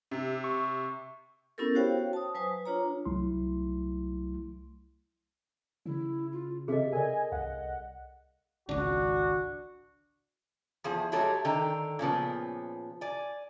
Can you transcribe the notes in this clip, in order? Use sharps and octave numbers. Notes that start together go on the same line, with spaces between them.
C3
C#6
B3 C#4 E4 G4 A4 A#4
F#4 C5 C#5 F5 G5
A5 D#6
F#3 B4 C5 G#5 D#6
D4 F4 C#5 A#5
C2 F#3 A3 E4 C6
C#3 E4
F4
C3 G#4 A4 D#5 E5
A#4 D5 D#5 G#5
C2 F5 F#5
G#1 C#2 D4 F#4
E2 F3 G#4
F#3 G#3 A3 G4 A4 C#5
D3 D#3 G5 A#5
A#2 C#3 F3 B3
D5 G#5